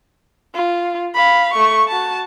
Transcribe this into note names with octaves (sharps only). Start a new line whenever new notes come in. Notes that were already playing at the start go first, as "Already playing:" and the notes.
F4
F5 B5
A3 C#6
F#4 A5